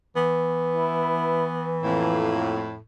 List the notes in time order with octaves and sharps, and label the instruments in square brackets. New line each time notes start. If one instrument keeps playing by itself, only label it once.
[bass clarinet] E3 [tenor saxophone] B3
[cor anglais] E4
[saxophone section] F2 A2 [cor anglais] A#3